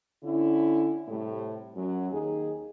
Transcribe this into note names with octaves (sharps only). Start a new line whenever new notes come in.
D3 C#4 E4
A2 C3 G3 A3
F#2 F#3
D#2 D#4 G#4